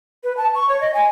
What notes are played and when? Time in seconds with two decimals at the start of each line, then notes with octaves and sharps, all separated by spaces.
0.24 B4
0.37 A5
0.55 C#6
0.69 C#5
0.81 D#5
0.94 G#5